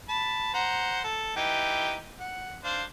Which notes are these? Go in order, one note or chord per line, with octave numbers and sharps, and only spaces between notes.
A5 B5
C5 F#5 A#5
A4
E3 D#4 G4
F#5
D4 C5 F5